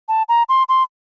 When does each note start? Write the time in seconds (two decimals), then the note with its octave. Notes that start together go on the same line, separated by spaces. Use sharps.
0.08 A5
0.29 A#5
0.49 C6
0.69 C6